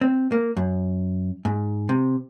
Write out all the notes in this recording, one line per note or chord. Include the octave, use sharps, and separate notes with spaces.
C4
A#3
F#2
G#2
C3